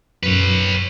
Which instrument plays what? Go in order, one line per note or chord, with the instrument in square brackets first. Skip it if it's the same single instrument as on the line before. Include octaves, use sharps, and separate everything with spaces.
[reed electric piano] F#2 [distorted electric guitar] B4 C#5